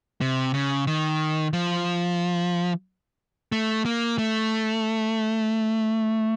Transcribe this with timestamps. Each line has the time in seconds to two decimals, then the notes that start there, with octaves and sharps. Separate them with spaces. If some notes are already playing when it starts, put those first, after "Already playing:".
0.21 C3
0.54 C#3
0.87 D#3
1.53 F3
3.52 A3
3.86 A#3
4.18 A3